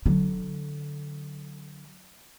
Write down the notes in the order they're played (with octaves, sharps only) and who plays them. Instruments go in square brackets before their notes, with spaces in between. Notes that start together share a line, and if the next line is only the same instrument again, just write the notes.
[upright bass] D3 F#3